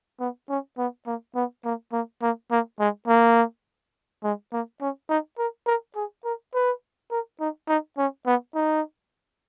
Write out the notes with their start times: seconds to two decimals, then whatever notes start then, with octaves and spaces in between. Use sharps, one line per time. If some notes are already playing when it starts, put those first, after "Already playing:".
0.20 B3
0.49 C#4
0.78 B3
1.06 A#3
1.35 B3
1.65 A#3
1.93 A#3
2.22 A#3
2.51 A#3
2.80 G#3
3.08 A#3
4.24 G#3
4.52 A#3
4.81 C#4
5.09 D#4
5.38 A#4
5.66 A#4
5.96 G#4
6.24 A#4
6.54 B4
7.11 A#4
7.40 D#4
7.69 D#4
7.98 C#4
8.26 B3
8.55 D#4